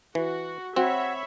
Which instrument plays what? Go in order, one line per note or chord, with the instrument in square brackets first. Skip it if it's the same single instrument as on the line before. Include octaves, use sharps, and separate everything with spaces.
[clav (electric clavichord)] E3 [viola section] F#4
[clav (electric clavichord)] C4 [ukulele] F#4 [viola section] C#5 E5 B5